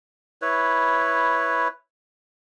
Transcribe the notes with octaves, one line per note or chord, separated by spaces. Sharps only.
E4 B4 C#5